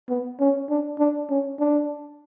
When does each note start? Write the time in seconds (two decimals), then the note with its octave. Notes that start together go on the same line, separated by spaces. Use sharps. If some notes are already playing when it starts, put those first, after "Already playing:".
0.09 B3
0.40 C#4
0.70 D4
0.99 D4
1.29 C#4
1.59 D4